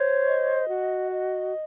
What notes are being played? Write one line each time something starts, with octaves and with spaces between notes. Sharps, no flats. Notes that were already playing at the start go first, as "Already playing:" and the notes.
Already playing: C5 C#5
D#5
F#4
D#5